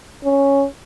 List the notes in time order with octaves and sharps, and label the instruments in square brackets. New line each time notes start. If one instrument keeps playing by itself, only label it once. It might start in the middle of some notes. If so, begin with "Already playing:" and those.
[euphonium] C#4